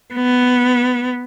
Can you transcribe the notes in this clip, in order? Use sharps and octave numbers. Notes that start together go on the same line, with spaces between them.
B3